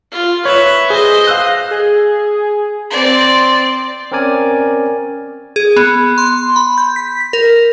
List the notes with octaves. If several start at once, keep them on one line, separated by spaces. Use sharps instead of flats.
F4
B4 C#5 E5
G#4 C5 D#5
F5 E6 F#6
G#4
C4 D5
C4 C#4 A#4 D5 G#5
G#4
B3
C6
B5
G6
B6
B6
A#4